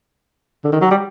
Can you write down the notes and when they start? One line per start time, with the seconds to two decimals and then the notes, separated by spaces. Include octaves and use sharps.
0.64 D3
0.73 D#3
0.81 F#3
0.91 G3